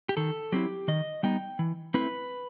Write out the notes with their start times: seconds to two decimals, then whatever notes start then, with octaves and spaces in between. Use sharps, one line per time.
0.09 G4
0.17 D#3 A4
0.52 F#3 C4 E4 G4
0.88 D#3 D#5
1.23 G3 B3 D#4 G5
1.59 E3
1.94 A3 C4 E4 B4